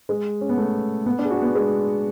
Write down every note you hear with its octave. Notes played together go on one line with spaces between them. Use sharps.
G#3
C#4
B3
A3
B3
D4
G#4
F#4
B3
G#3